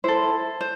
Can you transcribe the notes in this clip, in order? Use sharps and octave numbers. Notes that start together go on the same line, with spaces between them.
E4 A4 C5
C5